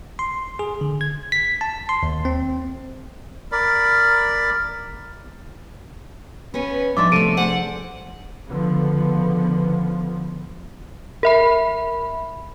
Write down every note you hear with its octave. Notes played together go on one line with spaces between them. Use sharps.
C6
G#4
D3
G#6
B6
A5
C6
D#2
C4
A#4 D5 B5
B3 C#4 B4
F3 D4 D#4 E5 C6 D6 A6
C3 A3 A4 D7 D#7
D4 G#4 C5 F#5
C#2 D3 F3 B3
A#4 E5 B5